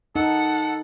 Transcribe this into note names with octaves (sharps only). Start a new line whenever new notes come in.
D#4 A4 F#5